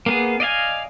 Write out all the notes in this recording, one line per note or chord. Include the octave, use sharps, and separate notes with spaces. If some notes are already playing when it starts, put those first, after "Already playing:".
A#3 B3 G#4
D5 D#5 F5 G#5